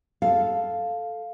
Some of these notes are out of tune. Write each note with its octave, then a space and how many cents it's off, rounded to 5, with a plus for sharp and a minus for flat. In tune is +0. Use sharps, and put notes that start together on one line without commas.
A4 +0 F5 +0